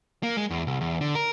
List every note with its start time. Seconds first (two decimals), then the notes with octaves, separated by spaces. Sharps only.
0.23 A#3
0.37 G#3
0.50 E2
0.67 C2
0.81 E2
1.01 D3
1.15 A#4